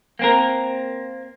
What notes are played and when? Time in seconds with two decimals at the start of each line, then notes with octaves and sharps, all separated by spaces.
0.19 A#3 C4 A#4